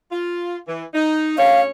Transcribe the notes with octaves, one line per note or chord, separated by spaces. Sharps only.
F4
E3
D#4
D2 C#4 C#5 F5